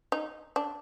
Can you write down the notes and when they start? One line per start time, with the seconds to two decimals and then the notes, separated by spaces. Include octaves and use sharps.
0.12 D#4
0.56 D4